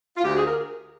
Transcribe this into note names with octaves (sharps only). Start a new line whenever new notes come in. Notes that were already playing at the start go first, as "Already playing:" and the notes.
F4
D2 G4
G#4
A#4